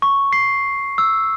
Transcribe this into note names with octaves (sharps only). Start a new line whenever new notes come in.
C#6
C7
E6